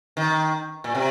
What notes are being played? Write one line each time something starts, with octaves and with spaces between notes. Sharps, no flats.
D#3
A#2
C3